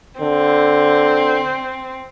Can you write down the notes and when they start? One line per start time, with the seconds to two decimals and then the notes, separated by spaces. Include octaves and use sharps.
0.20 D3 C4